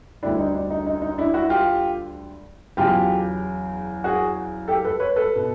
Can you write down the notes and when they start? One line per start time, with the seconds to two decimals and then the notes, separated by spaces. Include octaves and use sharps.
0.23 D2 D3 G3 D4 E4
0.39 D#4
0.54 D4
0.70 D#4
0.86 D#4
1.02 D#4
1.18 D4 E4
1.34 E4 F#4
1.50 F4 G4
2.77 E2 C#3 F#3 F4 G4
4.04 F#4 G#4
4.68 G4 A4
4.84 A4 B4
5.00 B4 C#5
5.16 A4 B4
5.36 B2